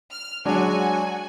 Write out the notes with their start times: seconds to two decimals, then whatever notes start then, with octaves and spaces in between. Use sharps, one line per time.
0.11 F6
0.45 F#3 G#3 D4 F#4 G#5